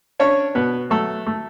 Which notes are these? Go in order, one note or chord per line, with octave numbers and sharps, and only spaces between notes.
C#4 D4 C#5
B2 B3 B4
F#3 A3 A4
A3